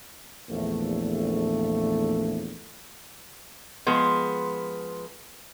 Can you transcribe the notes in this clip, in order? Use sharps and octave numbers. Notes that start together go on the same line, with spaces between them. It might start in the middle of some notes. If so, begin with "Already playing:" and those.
A#1 E2 A3
F3 G#3 B3